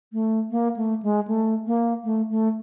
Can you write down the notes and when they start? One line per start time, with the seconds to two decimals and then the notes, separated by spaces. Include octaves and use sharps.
0.12 A3
0.51 A#3
0.76 A3
1.02 G#3
1.27 A3
1.66 A#3
2.04 A3
2.30 A3